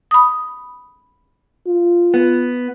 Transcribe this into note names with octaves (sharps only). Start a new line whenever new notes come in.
B5 D#6
F4
B3